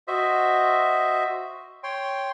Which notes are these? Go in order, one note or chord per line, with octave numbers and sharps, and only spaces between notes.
F#4 C5 D#5 E5
C#5 G5 C6